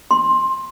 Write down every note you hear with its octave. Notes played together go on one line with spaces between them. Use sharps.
C6